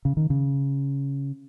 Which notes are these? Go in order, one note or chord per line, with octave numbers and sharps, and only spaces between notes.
C#3
D#3
C#3